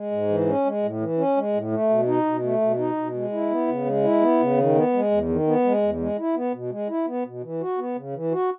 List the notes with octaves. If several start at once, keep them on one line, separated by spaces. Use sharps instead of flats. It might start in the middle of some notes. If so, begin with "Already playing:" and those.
Already playing: G#3
G#2
E3
C#4
G#3
A2
E3
C#4
G#3
A2
A3
B2
D#4
B2
A3
B2
D#4
B2
G#3
E4
B3
C#3
G#3
E4
B3
C#3
D#3
B3
G#3
E2
D#3
B3
G#3
E2
G#3
E4
B3
B2
G#3
E4
B3
B2
E3
F#4
B3
C#3
E3
F#4